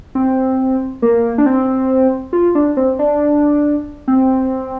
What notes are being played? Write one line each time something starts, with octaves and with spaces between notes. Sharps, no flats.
C4
A#3
D4
C4
F4
D4
C4
D4
C4